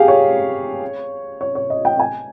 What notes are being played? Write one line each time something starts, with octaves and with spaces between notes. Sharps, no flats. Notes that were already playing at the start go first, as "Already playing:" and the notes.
Already playing: G4 G#4 F5
C#5
C#5
C#5
D#5
G5
G#5